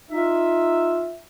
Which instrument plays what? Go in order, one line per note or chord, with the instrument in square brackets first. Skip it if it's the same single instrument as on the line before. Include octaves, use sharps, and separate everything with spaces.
[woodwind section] D#4 F4 E5